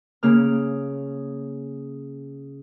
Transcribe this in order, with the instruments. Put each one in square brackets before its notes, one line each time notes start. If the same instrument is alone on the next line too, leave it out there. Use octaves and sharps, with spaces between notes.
[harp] C#3 A#3 F6